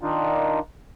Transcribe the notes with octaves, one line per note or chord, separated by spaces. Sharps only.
D#3 D4 D#4 F4